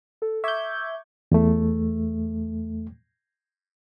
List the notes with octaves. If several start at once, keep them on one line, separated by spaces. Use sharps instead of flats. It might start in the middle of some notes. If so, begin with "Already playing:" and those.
A4
E5 C#6 D6 G6 G#6
E2 A3